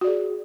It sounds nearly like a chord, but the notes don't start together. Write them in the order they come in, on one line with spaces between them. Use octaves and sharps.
F#4 D5 G#4